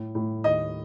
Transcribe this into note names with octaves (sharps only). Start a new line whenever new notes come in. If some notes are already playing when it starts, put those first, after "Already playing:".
Already playing: A2
A2
D#2 D#5